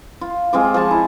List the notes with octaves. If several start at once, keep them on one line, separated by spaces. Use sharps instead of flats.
F4
G#3 C4 F4 D6
F3 G#4 A5 C#6
E4